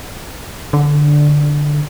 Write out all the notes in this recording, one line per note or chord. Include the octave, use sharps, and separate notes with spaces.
D3